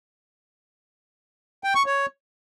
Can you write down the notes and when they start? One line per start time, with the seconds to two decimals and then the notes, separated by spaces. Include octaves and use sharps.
1.64 G5
1.75 C#6
1.86 C#5